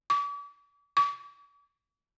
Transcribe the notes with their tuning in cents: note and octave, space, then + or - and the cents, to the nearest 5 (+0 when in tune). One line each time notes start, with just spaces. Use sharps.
D6 -40
D6 -45